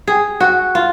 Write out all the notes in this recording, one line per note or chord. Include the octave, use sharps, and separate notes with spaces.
G#4
F#4
F4